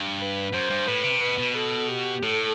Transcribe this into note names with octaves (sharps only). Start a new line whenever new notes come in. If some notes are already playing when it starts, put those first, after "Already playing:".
Already playing: G2
B4
F#2 C5
G2
A2 B4
C3
B2 B4
B2
A4
G4
A2 A4